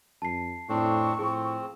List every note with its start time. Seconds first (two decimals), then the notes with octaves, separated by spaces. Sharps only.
0.22 F2 A5 C7
0.69 F2 A2 C4 D4 C#6
1.19 A2 F3 C4 G#4